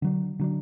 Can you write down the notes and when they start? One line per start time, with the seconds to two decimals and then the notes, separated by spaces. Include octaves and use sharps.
0.02 D3 F#3 D4
0.39 D3 F#3 D4